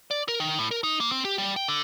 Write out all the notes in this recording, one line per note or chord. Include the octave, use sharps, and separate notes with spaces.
D5
A#4
D#3
A2
A#4
D#4
A#3
C4
G4
G3
G5
D3